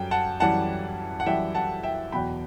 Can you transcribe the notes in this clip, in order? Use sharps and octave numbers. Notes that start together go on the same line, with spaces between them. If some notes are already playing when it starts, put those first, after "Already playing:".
Already playing: F#2 G3 G5
F#5 A5
F#2 E3 G3 F#5 A5
F#5
F#2 E3 G3 E5 G5
F#5 A5
E5 G5
E2 B2 F#3 G5 B5